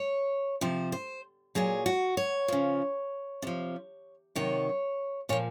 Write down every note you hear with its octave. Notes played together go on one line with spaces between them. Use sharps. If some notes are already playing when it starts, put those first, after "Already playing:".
Already playing: C#5
C3 F3 C5
C5
A#2 F#3 G#4
F#4
C#5
C#3 F3
C3 F3
C3 D#3 F#3 C#5
A#2 F3 C#5